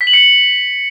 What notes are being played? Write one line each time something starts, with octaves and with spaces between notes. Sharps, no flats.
B6
F#7
C#7